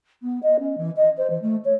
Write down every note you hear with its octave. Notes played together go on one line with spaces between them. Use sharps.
B3
D#5
C#4
E3
D#5
C5
E3
A3
C#5